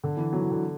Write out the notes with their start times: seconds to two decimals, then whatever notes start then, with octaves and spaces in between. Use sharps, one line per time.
0.04 D3
0.17 E3
0.33 F#3
0.42 E3
0.52 D3